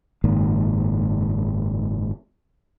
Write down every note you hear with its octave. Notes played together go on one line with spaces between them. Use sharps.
F#1 G#2 D#3 A#3